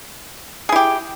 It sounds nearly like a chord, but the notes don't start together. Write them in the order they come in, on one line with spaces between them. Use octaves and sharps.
G#4 E4 G4